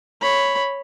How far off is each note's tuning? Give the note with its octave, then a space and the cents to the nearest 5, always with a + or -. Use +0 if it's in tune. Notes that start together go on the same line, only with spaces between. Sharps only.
C#5 +0 B5 +0